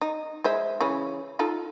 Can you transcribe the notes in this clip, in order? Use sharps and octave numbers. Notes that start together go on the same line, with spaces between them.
D#4
G#3 C5 E5
C#3 E3 C#4
D#4 F4 A4